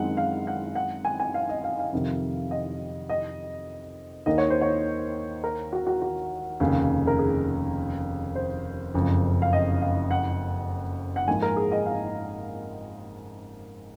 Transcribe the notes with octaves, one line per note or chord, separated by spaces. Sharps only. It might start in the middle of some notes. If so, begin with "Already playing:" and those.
Already playing: F#2 D#3 G#3 C4 D#4 F#5
F5
F#5
F#5
G#5
G#5
F5
D#5
F5
F5
F2 C3 D#3
D#5
D#5
D#2 D#3 A#3 D#4 D#5
C#5
C5
C#5
A#4
F#4
F#4
F#4
F1 D#2 C#3
A#4
G#4
C5
F#1 F2 C#3
F5
D#5
F5
F#5
F#5
G#2 F3 A#3 D#4 G#5
A#4
G#4
D#5
F5